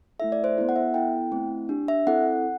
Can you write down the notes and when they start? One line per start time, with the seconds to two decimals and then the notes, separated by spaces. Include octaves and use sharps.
0.20 A3 E4 A4 E5
0.32 D5
0.44 C5
0.57 B3 E4 A4
0.69 F#5
0.76 E5
0.94 B3 E4 A4 G5
1.32 A3 C4 E4
1.69 D4 G4
1.88 E5
2.07 C4 E4 A4 F#5